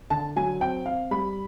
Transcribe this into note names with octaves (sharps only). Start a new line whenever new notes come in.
D3 A5
F#3 G#5
C4 G5
C4 F5
G3 B5